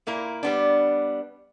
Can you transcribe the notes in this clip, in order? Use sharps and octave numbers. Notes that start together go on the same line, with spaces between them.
A#2 A#3 E4 A#5
G3 B3 D4